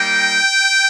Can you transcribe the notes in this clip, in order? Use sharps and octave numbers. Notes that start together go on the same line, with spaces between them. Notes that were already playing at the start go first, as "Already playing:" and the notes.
Already playing: G3 A#3 D#4 G5